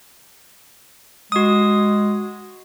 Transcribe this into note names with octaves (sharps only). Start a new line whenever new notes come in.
G#3 F#4 D#6